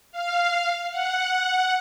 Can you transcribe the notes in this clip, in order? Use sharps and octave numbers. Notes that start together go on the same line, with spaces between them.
F5
F#5